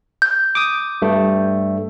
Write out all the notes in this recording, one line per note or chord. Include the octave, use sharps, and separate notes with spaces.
G6
D6 D#6
G2 A3